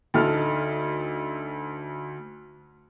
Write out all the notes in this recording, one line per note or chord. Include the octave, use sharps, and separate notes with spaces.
D2 D#4 A4 F6